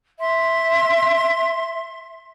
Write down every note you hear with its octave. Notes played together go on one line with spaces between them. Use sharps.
E5 C6